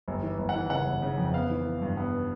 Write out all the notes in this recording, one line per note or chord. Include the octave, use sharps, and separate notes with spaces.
G1
E3
G1
F#5
E3
C#3 F#5
G1
C#3
F2
B3 F5
E3
E3
G2
B3